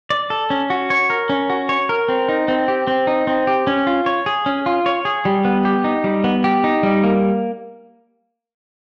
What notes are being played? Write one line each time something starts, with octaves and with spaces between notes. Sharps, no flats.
D5
A4
C#4
F#4
C#5
A#4
C#4
F#4
C#5
A#4
C4
D#4
C4
G4
C4
D#4
C4
G4
C#4
F4
C#5
G#4
C#4
F4
C#5
G#4
G3
B3
G4
D#4
G3
B3
G4
D#4
G3
A#3